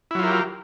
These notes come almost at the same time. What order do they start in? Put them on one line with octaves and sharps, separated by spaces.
E4 F#3 F4 A#4 G4